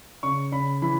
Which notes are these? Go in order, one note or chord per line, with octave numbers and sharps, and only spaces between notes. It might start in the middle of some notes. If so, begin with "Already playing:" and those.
C#3 C#6
C#3 B5
E3 B5